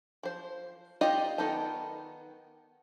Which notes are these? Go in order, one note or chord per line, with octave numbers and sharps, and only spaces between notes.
F3 C5
D#4 F4 G4 D5 D#5
D#3 B3 D#4 A4 A5